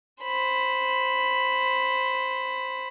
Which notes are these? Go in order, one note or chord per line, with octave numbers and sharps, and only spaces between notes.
C5 B5